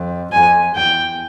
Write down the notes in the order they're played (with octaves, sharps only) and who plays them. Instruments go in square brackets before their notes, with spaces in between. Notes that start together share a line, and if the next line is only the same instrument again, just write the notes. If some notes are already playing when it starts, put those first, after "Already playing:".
Already playing: [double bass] F2
[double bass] F2 [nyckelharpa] G#5
[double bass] E2 [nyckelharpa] G5